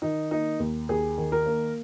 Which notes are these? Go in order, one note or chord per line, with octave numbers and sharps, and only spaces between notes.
D#3 D#4
A#3 D#4
D#2
D#2 G#4
D#3
A#4
A#3